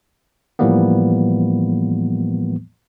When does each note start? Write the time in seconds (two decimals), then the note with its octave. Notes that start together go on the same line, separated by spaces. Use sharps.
0.59 A2 E3 F3 G3 A#3 B3